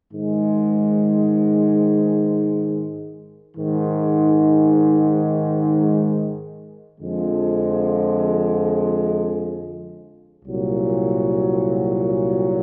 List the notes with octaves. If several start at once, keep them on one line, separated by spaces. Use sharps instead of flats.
G#2 D#3 G#3
G#2 D#3 G#3
F2 D3 F3 G#3
C2 A#2 F#3